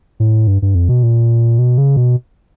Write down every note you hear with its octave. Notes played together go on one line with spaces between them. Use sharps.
A2
G2
G2
F2
B2
A#2
B2
C#3
B2